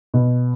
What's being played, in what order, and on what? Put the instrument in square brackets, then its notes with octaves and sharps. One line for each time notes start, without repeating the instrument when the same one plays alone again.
[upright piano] B2